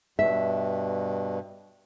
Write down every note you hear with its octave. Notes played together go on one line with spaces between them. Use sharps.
G2 B2 E5